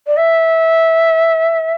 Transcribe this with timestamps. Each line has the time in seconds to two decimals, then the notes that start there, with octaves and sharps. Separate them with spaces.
0.07 D5
0.17 E5